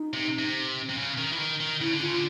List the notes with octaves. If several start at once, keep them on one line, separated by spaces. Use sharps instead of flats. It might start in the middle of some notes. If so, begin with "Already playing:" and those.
Already playing: D#4
C3
C3
C3
C#3
D#3
E3
D#3
D#3
C#3 E4
D3
C#3 F4
D3